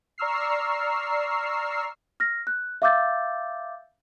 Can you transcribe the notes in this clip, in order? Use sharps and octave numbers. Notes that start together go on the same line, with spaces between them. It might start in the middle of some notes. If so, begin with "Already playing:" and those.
D5 A#5 C#6 E6 F6 C7
F6 A#6
F#6
E5 F5 D6 E6 G6 A6